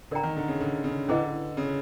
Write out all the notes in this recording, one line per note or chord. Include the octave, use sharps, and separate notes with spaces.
D3 A#4 D5 G5 A#5
D#3
D3
C#3
D3
C#3
D3 C#4 E4 G#4 B4 D#5
C#3